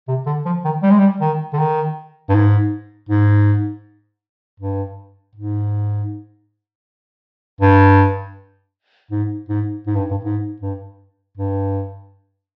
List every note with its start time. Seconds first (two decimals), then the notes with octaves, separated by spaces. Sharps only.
0.08 C3
0.26 D3
0.46 F3
0.65 D#3
0.83 G3
0.91 G#3
0.98 G3
1.20 D#3
1.53 D3
1.59 D#3
2.29 G2
2.34 G#2
3.09 G#2
4.60 G2
5.35 G#2
7.61 G2
9.11 G#2
9.49 G#2
9.87 G#2
9.95 G2
10.11 G2
10.24 G#2
10.62 G2
11.38 G2